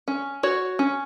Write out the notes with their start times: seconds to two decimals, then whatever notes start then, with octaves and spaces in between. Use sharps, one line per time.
0.08 C#4
0.43 F#4 C#5
0.79 C#4